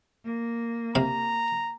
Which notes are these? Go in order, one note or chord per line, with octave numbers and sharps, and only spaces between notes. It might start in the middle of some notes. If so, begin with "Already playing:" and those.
A#3
C3 F5 A#5